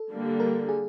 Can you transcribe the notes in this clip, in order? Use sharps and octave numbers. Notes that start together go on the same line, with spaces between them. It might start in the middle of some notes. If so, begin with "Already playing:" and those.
Already playing: A4
D3 G3 A#3
A#4
G#4